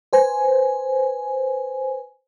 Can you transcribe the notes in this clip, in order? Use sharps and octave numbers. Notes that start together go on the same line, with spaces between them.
B4 C5 G#5